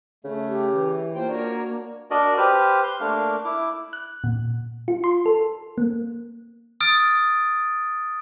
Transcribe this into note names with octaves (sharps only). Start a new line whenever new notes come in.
C#3 A3
G4
E3
A#3 F4 C5 G5
D4 F#4 A#4 C#5
D4 F#4 A#4 D5 D#5
G4 B4 C5 F6
C6
A3 A#3 D4 F5
E4 D6
F#6
A#2
F4
C6
A4
A#3
D#6 F6 A6 D7